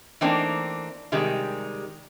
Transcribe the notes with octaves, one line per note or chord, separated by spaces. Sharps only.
E3 A3 A#3 C4 D4 D#4
C3 D#3 G3 G#3